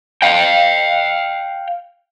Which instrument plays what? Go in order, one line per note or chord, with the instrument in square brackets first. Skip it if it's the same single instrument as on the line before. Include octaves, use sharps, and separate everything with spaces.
[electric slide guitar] F5 G5